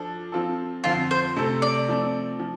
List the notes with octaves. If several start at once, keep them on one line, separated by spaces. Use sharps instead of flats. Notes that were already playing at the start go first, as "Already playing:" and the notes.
Already playing: F3 D4 A4
F3 C4 F4 A4
F2 D3 F3 C4 F4
C5
C3 A3 C4 A4
D5
F3 A3 C4
F3